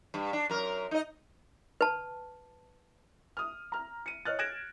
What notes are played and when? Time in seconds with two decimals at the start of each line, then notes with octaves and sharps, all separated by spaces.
0.14 G2
0.33 D4
0.49 F#2 A#4
0.91 D#4 D#5
1.81 B4 A5
3.37 D#6 F6
3.72 A#5 F6
4.06 C#7 D#7
4.25 C#5 D#5 F6 F#6 A6
4.39 F#6 G#6 A#6 D7 E7